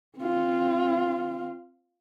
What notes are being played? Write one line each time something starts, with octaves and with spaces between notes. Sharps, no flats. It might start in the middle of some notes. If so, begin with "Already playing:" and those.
C4 F4